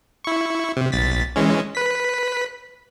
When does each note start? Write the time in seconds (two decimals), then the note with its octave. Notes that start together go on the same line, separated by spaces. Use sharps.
0.25 E4 C#6
0.77 C3
0.92 B1 A6 B6
1.36 E3 G#3 C#4
1.75 B4 B6